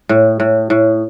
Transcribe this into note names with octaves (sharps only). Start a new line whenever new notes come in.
A2
A2
A2